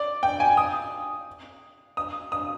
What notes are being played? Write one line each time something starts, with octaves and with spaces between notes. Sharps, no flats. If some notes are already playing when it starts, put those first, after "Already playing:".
Already playing: D5
G5
G#5
D#6
D#6
D#6